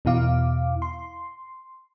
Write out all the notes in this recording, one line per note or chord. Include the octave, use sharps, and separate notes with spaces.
E2 B2 E4 F5 D6
C6